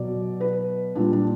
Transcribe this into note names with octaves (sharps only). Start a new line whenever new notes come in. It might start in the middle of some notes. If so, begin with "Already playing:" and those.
Already playing: B2 F#3 D5
B4
A#2 G3 D4
D4